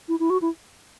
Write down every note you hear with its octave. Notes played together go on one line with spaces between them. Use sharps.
E4
E4
F#4
E4